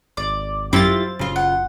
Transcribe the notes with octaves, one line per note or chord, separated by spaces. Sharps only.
G#1 D5
F#2 C4 E4 F4 G4 A6
F#1 C#3 F4
F#5